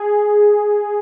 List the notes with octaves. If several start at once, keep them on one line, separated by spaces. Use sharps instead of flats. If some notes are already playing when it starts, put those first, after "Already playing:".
Already playing: G#4